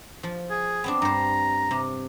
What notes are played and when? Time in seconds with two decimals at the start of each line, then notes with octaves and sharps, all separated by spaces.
0.23 F3
0.51 G#4
0.84 B3 C4 D4
1.02 G2 C5 A#5
1.71 C3